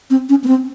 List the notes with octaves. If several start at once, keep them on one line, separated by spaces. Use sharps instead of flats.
C4
C#4
B3
C4